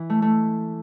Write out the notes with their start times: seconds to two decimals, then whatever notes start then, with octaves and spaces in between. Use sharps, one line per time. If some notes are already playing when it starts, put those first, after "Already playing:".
Already playing: E3
0.10 A3
0.22 A3